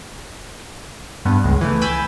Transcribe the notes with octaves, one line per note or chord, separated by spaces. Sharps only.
G2 B3
C#2 G#3
E3 A3
G5 G#5 B5 E6 G6 A6